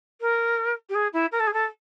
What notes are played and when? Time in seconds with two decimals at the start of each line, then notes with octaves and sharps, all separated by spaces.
0.21 A#4
0.89 G4
0.94 G#4
1.13 E4
1.31 A#4
1.40 A4
1.47 G#4
1.53 A4